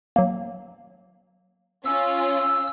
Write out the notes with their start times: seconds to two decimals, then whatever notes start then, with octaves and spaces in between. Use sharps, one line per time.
0.16 F#3 A#3
1.85 C#4 F4 E6